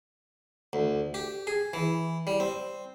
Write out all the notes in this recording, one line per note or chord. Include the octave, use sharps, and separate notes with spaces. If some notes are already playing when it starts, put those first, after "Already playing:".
D2
G4
G#4
E3
G3
C4